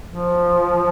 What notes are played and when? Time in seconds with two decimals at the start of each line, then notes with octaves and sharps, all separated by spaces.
0.07 F3